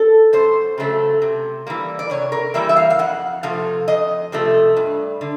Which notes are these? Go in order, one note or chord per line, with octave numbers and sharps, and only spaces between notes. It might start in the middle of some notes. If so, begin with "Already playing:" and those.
Already playing: A4
F#2 C5
C#3 F#3 A3
C3
E3 G3 A#3
D5
C3 C#5
A#4
E3 G3 A#3 E5
E5
F5
F5
F2 F#5
C3 F3 A3 F5
F2 D#5
C3 F3 A3
G2
D3